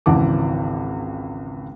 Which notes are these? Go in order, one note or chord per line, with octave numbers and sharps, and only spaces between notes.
G#1 C#2 E3 F#5 A5 D6